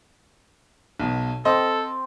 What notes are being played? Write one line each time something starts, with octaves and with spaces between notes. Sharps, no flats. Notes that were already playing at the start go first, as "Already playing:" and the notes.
B1 B2
C4 A4 D#5